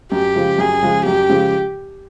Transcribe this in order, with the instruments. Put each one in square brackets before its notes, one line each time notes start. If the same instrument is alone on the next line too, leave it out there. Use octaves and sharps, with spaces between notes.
[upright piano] F#2 [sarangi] G4
[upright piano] C#3 F3 G#3
[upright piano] F#2 [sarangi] G#4
[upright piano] C#3 F3 G#3
[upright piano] F#2 [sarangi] G4
[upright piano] C#3 F3 G#3